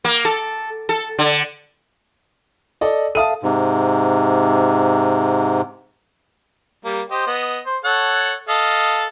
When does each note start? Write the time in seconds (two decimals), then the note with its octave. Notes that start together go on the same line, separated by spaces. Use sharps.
0.04 A#3
0.25 A4
0.89 A4
1.19 D3
2.81 A4 D5 D#5
3.15 A4 E5 F5 A5 D#6 D#7
3.43 G#2 C3
6.85 G3 A#3
7.11 G4 C5 D#5
7.27 B3 D#5
7.66 C5
7.85 A4 C#5 F#5
8.49 A4 D#5 F5